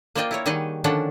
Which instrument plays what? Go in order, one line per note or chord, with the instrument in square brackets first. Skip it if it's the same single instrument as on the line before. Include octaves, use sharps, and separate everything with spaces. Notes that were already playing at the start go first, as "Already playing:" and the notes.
[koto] A#3 F4 C5 D5 D#5 G5
E4 A#4 C#5
D#3 G3 D#4 G#4 D#5 F#5
D3 D#3 F3 C#4 D4 F#5